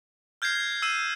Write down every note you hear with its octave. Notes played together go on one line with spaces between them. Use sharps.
F6 G6 G#6 A#6 C7
E6 C7 D#7 E7